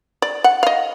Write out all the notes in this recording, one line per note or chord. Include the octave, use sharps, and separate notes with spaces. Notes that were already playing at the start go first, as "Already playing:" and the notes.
D5
F#5
D#5 F5